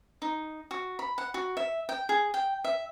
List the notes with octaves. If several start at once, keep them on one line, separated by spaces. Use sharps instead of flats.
D#4
F#4
B5
F#5
F#4
E5
G5
G#4
G5
E5